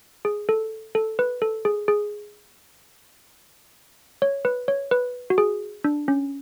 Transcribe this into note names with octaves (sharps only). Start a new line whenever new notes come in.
G#4
A4
A4
B4
A4
G#4
G#4
C#5
B4
C#5
B4
F#4
G#4
D4
C#4